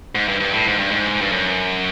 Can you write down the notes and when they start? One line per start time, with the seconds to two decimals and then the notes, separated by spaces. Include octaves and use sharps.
0.15 G#2
0.28 G2
0.40 G2
0.53 A2
0.67 G#2
0.78 G2
0.92 G#2
1.21 G2
1.32 F#2